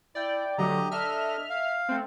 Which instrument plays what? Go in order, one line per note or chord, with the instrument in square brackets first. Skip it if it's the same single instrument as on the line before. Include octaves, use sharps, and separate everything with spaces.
[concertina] E4 [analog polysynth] D5 G5
[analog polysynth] D3 F#3 A3 [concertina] G4 D#5 A#5
[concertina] D4 A4 D#5 [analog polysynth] E5 F6
[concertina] F5
[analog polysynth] A3 C4